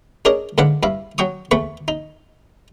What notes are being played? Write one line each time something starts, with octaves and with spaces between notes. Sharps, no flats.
D4 G#4 A#4 C#5 D#5
G#2 D3 D4 B4 F5 F#5
G2 E4 F5
F#3 G5 C#6 D#6
E2 A3 B4 C#6
D#4